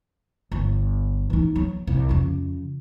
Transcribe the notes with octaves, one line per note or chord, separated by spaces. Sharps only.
G1
E3 D#4
F#3
C2
F2 C#3